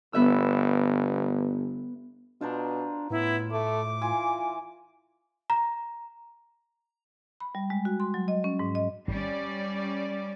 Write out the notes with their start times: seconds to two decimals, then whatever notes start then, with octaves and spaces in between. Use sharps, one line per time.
0.13 G1 B3 E5 E6
2.41 B2 D4 F4 C5 A#5
3.10 A2 B3 E4
3.51 A3 D6
4.02 E3 F4 G#5 C6
5.50 A#5
7.40 B5
7.55 G3
7.70 G#3
7.85 F#4
8.00 C6
8.14 F#3
8.28 D#5
8.44 C#4
8.59 G#2
8.75 D#5
9.08 G#1 G3 C#4 D5